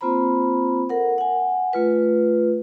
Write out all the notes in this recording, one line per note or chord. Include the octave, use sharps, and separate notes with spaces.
A#3 C4 F4 C5 A#5 B5
A4 A#4 F#5
F#5 G#5
A3 F4 B4